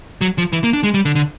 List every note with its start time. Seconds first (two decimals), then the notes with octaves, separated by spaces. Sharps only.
0.21 F#3
0.38 F3
0.53 E3
0.64 A#3
0.73 D4
0.83 G#3
0.94 G3
1.05 D3
1.15 D3